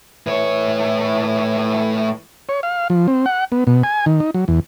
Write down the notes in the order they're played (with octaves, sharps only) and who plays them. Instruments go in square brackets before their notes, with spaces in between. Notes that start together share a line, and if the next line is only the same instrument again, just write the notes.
[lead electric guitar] A2 C#5 [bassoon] E3
[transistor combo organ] C#5
F5
F3
C4
F#5
B3
B2
G#5
D#3
D#4
F#3
E2